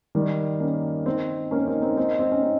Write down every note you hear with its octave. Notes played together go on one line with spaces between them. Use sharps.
D#3 G3
A#3 C#4
C4 D#4
A#3 C#4
C4 D#4
C4 D#4
C4 D#4
C4
C#4
C4 D#4